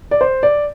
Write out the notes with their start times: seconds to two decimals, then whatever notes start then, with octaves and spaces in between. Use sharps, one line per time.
0.11 D5
0.21 C5
0.43 D5